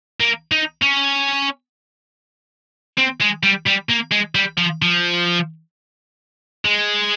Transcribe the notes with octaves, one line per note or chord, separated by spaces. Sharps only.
A#3
D#4
C#4
C4
G#3
G3
G3
A#3
G#3
G3
F3
F3
G#3